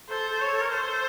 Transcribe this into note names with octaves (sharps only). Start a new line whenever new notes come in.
A4 C5
A4
C#5
A4
A#4
A4 C5